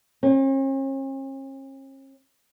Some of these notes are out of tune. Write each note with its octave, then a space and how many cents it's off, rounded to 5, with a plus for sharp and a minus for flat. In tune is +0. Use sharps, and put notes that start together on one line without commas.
C#4 -45